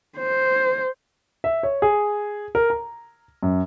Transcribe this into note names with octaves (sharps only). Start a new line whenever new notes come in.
C5
E5
C#5
G#4
A#4
A#5
F#2